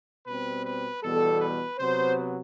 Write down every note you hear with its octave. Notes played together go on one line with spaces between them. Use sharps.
B2 G3 C4 B4
B4
E2 B2 G3 A4
B4
C3 F#3 B3 C5